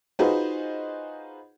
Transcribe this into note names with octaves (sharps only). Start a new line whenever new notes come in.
D#4 F4 F#4 G#4 B4 C5